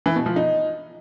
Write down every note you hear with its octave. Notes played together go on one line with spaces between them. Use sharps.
E3
B2
F3
D#4